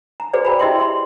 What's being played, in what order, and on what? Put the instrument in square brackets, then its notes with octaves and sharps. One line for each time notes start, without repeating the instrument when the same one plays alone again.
[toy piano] A#5
F#4 G#4 B4 C5 D5
G5 A#5 B5
E4 G4 D#5 E5 G5 C6
C6